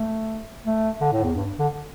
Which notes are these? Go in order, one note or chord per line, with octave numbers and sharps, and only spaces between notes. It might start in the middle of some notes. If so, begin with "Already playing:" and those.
Already playing: A3
A3
D3
A2
E2
G2
D3